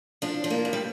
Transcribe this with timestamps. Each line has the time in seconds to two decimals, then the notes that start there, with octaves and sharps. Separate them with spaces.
0.22 F3 D4
0.44 F3
0.50 A#3
0.65 G2
0.73 G3